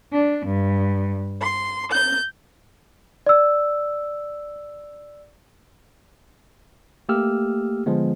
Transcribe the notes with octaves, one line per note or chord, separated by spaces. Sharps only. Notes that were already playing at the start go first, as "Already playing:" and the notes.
D4
G2
C6
G6
D5 E6
A3 A#3 G4 E6 F6
D3 F3 G#3 B3